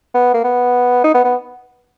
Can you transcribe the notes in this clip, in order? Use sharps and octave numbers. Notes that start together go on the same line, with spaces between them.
B3
A#3
B3
D#4
B3
B3